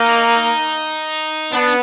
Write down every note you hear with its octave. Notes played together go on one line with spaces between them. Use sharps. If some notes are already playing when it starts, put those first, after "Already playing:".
Already playing: A#3 D#4
B3 D4